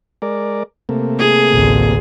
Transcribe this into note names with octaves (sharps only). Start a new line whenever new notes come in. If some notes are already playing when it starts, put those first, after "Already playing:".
G#3 A#4 D5
C3 A3 A#3
G#4
A1 D2